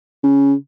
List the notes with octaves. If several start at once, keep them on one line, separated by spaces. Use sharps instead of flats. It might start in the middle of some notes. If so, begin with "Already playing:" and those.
C#3